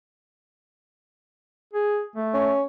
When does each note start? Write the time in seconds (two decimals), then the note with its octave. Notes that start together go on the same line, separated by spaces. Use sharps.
1.73 G#4
2.16 A3
2.34 C#4